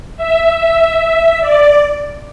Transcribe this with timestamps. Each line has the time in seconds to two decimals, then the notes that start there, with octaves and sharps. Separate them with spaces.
0.17 E5
0.57 E5
0.99 E5
1.40 D5